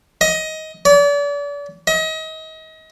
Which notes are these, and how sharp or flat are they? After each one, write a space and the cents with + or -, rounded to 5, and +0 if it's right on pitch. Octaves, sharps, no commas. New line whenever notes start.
D#5 +20
D5 -40
D#5 +35